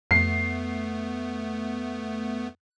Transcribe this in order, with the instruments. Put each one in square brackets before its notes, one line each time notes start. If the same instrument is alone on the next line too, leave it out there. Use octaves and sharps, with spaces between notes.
[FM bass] F2 [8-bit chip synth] A3 B3 [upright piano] C7